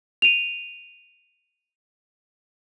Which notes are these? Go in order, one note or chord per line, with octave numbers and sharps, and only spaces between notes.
D#7 F7